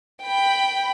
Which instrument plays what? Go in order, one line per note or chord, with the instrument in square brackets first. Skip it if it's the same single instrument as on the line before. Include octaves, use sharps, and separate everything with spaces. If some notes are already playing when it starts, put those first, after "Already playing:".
[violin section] G5 B5